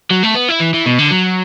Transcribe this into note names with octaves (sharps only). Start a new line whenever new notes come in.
F#3
A3
B3
E4
E3
E3
B2
D3
F#3